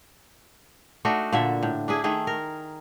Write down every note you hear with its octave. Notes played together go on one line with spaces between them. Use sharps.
A3 D4 D#4 F#4
A#2 D3 E5
A2
D4 E4 G#4
D#3 A3 G#4
A#4